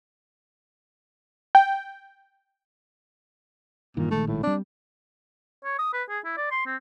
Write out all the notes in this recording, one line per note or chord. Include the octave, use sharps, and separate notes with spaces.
G5
G2 A#2 D#3 E3
A#1 D#3 G#3 A3
A2
G3 C4 D4
C#5
D#6
B4
G#4
E4
D5
C6
C4